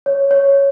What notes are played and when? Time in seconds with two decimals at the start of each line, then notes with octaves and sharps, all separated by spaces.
0.06 C#5
0.31 C#5